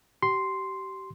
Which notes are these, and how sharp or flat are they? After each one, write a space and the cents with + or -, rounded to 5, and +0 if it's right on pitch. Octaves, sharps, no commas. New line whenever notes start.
G4 -35 C6 +0